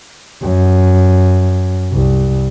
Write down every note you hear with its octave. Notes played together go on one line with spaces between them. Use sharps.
F#2
C2